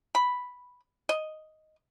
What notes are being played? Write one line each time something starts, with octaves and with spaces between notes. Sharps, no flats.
B5
D#5